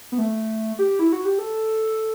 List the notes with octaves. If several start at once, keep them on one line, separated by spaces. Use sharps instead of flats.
B3
A3
G4
E4
F#4
G4
A4